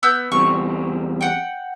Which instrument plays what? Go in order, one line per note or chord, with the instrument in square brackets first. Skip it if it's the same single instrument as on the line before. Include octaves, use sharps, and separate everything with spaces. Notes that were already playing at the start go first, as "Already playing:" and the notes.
[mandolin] B3 E6 G6
[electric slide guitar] E2 G3 C4 [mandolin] C#6
[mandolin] F#5 G5